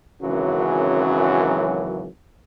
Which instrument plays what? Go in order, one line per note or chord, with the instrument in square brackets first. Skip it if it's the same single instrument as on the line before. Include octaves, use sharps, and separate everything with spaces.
[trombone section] G#1 F#2 C#3 E3 F#3